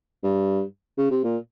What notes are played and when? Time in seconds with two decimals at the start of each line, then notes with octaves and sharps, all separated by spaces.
0.23 G2
0.98 C#3
1.11 C3
1.24 A#2